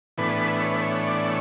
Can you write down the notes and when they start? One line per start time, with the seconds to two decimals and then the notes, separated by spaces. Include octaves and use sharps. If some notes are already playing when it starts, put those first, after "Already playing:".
0.18 A2 E3 B3 D4 B4
0.60 C#5
0.71 B4
0.80 C#5
1.04 D5
1.25 C#5